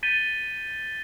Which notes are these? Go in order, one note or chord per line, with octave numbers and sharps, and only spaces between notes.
G6 A6 B6 D#7 G7